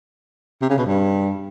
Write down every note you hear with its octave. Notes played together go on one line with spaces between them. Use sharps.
C3
C#3
B2
G2